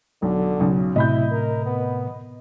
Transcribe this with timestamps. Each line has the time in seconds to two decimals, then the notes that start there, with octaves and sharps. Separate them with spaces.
0.22 B1 D3
0.59 B1 C#3
0.96 A2 C3 E4 D#5 B5 G6
1.31 A#4
1.66 B3